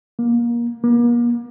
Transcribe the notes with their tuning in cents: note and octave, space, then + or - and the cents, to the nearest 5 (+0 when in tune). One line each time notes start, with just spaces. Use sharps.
A#3 +25
A#3 +40